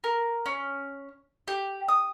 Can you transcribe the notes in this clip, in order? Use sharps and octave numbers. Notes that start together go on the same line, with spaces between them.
A#4
C#4
G4
D#6